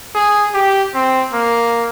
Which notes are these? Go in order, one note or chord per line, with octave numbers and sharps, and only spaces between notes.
G#4
G4
C4
A#3